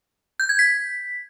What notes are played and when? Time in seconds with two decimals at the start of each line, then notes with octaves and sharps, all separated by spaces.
0.40 G6
0.49 G#6
0.59 B6